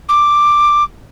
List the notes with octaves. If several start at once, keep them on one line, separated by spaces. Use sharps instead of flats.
D6